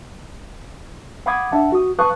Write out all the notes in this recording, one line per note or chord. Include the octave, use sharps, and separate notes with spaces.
F5 F#5 B5 D6 D#6 G#6
D4 E5 F#5 A5
F#4 D#6
B4 F5 A5 C#6 D#6 F#6